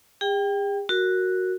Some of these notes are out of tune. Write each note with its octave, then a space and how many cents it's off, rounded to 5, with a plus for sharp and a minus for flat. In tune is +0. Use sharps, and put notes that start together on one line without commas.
G#4 -45 G5 +0
F#4 +0 A#4 -5